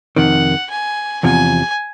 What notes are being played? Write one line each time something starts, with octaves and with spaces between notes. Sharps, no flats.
F2 C3 D#3 F#5
G#5
E2 C3 F3 G#5